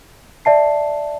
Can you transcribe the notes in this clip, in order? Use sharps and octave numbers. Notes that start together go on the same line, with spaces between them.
D5 E5 A5 C7